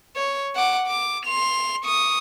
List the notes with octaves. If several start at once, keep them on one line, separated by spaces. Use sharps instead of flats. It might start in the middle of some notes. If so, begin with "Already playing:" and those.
C#5
F#5 D6
D6
C6 F7
C#6 D#6